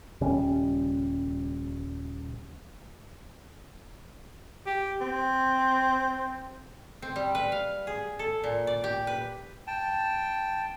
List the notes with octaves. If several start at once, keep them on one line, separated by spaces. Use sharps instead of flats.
D#1 C#3 G3 C#4
G4
C4
C4
G3
B4
F5
G#4
A4
A#2
D5
G4
B4
G5 A5